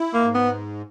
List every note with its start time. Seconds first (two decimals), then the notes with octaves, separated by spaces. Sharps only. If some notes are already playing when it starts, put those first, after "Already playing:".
Already playing: E4
0.14 A#3
0.21 G#2
0.34 B3